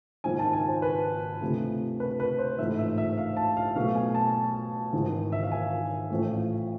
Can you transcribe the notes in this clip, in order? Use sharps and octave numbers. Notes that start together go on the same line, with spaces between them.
G#1 G#2 F3 G#5
A5
G#5
C5
B4
D2 C3 F3 A3
B4
B4
C5
A1 G#2 F3 A3 E5
E5
E5
F5
A5
F5
B1 B2 A3 F5
G#5
A5
G#1 G#2 E3 G#3
E5
F5
G#5
A1 A2 F3 A3